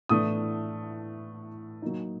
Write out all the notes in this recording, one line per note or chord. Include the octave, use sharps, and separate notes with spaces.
A2 E3 A3 D4 D#6
F#3 A#3 D#4